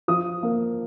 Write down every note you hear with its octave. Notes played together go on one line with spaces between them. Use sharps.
F3 D#6
A#3